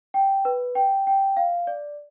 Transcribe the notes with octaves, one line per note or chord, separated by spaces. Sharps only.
G5
B4
G5
G5
F5
D5